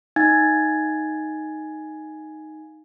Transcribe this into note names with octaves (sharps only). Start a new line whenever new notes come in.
D#4 F5 G#5 G#6 A6